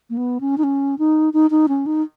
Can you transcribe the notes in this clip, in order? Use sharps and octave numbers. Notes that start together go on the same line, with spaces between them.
A#3
B3
C#4
D#4
C#4
D#4
D#4
D#4
C#4
D#4